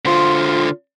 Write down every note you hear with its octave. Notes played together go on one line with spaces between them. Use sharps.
D3 F4 C5